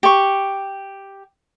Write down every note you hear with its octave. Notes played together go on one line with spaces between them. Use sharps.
G4 C#6